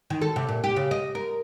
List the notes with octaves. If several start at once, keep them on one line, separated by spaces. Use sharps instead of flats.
D#3
A4
C3
A#2
G4
C#3
D#5
A#4